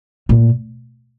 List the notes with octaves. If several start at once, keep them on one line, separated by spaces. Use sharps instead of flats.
A#2